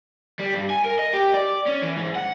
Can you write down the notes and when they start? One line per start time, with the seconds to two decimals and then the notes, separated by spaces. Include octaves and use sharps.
0.39 G3
0.55 G2
0.70 G#5
0.84 A#4
0.99 D#5
1.13 G4
1.34 D5
1.66 C#4
1.82 E3
1.97 G#2
2.15 F#5